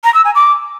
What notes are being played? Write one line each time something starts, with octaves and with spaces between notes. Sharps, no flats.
A#5
E6
G#5
D6